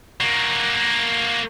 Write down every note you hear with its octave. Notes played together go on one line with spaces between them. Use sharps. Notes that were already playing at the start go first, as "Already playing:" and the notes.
A#3 F#4